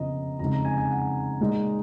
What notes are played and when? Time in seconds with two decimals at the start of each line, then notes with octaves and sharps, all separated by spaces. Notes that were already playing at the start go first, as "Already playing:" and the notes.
Already playing: F2 C#3 F3 B3 D#5 A#5
0.39 F2 C#3 G#3 D#4 A#5
0.53 A#5
0.65 G#5
0.77 G#5
0.90 F#5
1.40 A#2 G#3 D#4